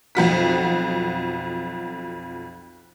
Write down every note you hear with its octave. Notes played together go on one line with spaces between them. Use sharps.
B1 F2 F#4 B6